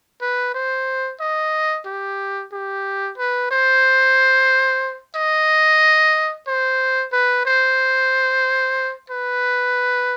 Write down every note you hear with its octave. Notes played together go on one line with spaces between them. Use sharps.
B4
C5
D#5
G4
G4
B4
C5
D#5
C5
B4
C5
B4